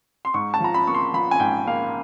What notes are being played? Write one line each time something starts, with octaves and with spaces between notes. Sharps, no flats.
C6
G#2 C#6
A5
F3 A#5
B5
A#3 C#6
C6
F3 B5
G#5
G#2 G5
A#3 F5